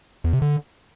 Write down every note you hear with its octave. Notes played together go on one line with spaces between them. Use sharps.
E2
C3
D3